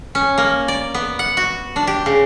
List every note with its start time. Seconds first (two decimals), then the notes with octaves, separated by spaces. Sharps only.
0.15 C#4
0.38 A#3
0.68 D5
0.94 B3
1.19 F#5
1.37 F#4
1.76 D4
1.87 G4
2.06 C#3